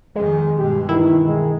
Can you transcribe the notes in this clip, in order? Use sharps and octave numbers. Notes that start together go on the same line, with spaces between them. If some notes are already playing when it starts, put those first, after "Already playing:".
F2 D#3 G#3
G2 B2 G4
D#3 E3 E4
G#3